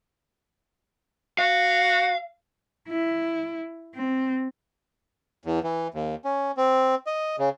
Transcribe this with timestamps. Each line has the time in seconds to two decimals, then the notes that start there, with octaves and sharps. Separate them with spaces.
1.39 F#4 F5
2.89 E4
3.95 C4
5.45 E2
5.63 E3
5.94 D#2
6.25 C#4
6.57 C4
7.06 D#5
7.38 C#3